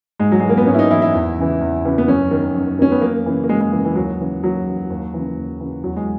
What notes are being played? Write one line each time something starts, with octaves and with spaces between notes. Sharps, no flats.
G#2 G#3
F#3
E3 G#3
A#3
B3
G#2 C#4
E4
D#4
E3 E4
E4
E2
C#3 E3
E2
C#3 E3
B3
F#2 C#4
D#3
F#2
D#3 C#4
B3
F#2 A#3
C#3 E3
A#3
F#2 G#3
G#3
C#3 E3
E3
D#2 F#3
C#3 E3
D#2 F#3
C#3 E3
D#2
C#3 E3
D#2
C#3 E3
E2 F#3
G#3